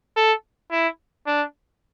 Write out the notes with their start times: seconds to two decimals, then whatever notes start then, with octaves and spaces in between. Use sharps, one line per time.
0.16 A4
0.71 E4
1.27 D4